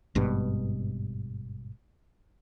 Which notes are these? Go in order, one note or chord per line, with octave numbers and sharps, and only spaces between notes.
G#1 G2 B2